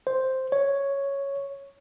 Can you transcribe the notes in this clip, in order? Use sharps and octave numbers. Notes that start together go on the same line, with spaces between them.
C5
C#5